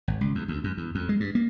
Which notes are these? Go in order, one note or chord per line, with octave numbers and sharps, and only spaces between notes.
G#1
C#2
E2
D2
F#2
E2
F2
G#3
G2
A#3